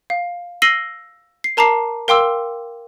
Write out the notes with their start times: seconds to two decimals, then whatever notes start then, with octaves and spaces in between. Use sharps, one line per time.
0.10 F5
0.62 E6 A#6 C7 D#7 F#7 G7
1.44 C7
1.57 A#4 A5 A#5 D6 C7
2.08 A#4 F5 G5 C6 D6 E6